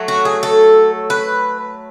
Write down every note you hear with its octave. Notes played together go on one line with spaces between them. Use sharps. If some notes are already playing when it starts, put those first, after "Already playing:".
Already playing: F#3 A3
F#4
G#4
A4
B4